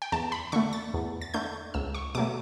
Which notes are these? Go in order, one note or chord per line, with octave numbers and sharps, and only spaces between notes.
G5
E2 A5
B5
D3 A3 C#6
A6
E2
A6
D3 A3 G6
C#2 E6
C#6
B2 F#3 A3 D6